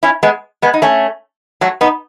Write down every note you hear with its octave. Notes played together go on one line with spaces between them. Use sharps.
C#4 E4
G#3 B3
G#3 B3
D#4
A3 C#4
F#3 A3
B3 D#4